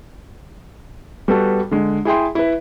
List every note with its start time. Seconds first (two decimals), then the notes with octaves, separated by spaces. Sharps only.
1.28 G3 B3 F#4 A4
1.71 D3 G#3
2.05 E4 G#4 G5 C6
2.35 E4 B4